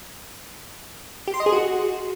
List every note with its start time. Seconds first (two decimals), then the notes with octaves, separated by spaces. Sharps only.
1.27 G4
1.34 C6
1.40 D#5
1.46 G#4
1.52 F#4